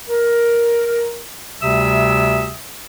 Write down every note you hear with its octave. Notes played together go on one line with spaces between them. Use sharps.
A#4
D2 C3 G3 E5 D#6 E6